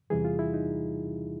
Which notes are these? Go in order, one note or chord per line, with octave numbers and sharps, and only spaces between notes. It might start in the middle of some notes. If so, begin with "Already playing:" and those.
E2 C3 E3 G3 G#4
F4
E4
D#4